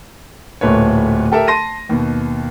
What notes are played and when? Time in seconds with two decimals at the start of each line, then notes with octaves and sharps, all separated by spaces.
0.61 D1 A#2 A3 B4 C#5
1.32 G4 A4 A#4 E5
1.48 A5 C6 A#6 D#7
1.89 D#2 B2